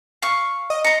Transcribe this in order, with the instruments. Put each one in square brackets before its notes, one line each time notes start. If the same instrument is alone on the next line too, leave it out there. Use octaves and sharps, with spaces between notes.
[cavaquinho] F5 C#6
[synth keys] D#5
[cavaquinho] A#5 C6 [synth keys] A#6 C#7